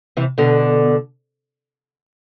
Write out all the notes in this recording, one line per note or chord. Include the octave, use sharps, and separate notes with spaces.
C3 E3
B2 D3